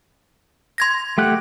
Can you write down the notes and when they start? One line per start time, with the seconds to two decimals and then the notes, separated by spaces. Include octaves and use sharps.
0.78 C6 G#6 A#6
1.18 A3 G4 F#5